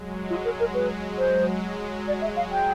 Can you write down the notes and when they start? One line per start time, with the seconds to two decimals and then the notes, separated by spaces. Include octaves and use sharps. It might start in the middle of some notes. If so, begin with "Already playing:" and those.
Already playing: F#3 G#3
0.30 F4
0.45 A#4
0.60 A#4
0.74 B4
1.18 F#3 G#3 C5
2.08 D5
2.21 E5
2.36 F5
2.52 G5